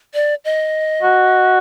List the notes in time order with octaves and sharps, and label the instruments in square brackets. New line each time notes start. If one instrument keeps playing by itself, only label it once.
[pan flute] D5
D#5
[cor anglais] F#4